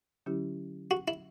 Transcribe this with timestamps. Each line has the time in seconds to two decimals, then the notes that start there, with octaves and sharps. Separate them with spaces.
0.26 D3 F#3 C#4 E4 G4
0.91 F#4
1.08 E4